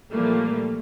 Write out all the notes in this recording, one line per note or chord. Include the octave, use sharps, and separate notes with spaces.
A#2 E3 F3 G3 A3 A#3